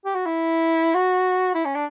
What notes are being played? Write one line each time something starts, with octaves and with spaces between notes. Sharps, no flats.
G4
F#4
E4
F#4
E4
C#4
D4